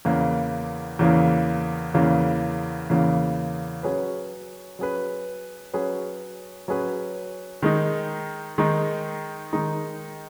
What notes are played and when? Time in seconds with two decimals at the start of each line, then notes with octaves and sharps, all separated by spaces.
0.05 E2 C#3 E3 A#3
0.99 E2 C#3 E3 A#3
1.94 E2 C#3 E3 A#3
2.90 E2 C#3 E3 A#3
3.83 F#3 C#4 G#4 B4
4.79 F#3 C#4 G#4 B4
5.74 F#3 C#4 G#4 B4
6.68 F#3 C#4 G#4 B4
7.62 D#3 G#3 D#4
8.58 D#3 G#3 D#4
9.53 D#3 G#3 D#4